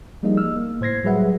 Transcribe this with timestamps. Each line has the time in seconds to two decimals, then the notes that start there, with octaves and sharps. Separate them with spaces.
0.23 F3 G3 A#3 D#4 G#4 D#5
0.37 E6 F6
0.56 A#3
0.81 A2 C5 G#6 A#6 C7
1.04 F#3 G3 G#4 B4 E5 F#5